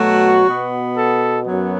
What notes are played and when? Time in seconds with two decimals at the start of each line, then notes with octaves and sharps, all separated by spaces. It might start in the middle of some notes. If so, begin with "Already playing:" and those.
Already playing: B2 F#3 A3 F#4
0.48 B2 B3
0.95 A4
1.45 F#2 F#3 B3